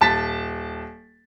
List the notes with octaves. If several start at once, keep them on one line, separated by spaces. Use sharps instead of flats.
D#1 A5 A6 B6